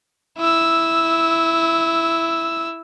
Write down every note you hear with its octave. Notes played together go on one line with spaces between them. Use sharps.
E4 E6